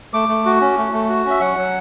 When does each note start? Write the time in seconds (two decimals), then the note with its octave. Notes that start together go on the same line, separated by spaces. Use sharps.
0.13 A3 D6
0.29 A3
0.45 F#4
0.61 C#4
0.78 A3
0.92 A3
1.09 F#4
1.25 C#4 E5
1.41 F#3 F#5
1.57 F#3